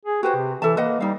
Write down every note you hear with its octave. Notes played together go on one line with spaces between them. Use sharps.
G#4
F#4 G4 B4 C5
C3
E3 A4 E5 A5
A#3 B4 D#5 F#5
G3 D#4 F5